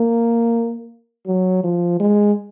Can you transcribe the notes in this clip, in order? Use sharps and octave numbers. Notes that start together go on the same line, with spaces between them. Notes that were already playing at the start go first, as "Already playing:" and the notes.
Already playing: A#3
F#3
F3
G#3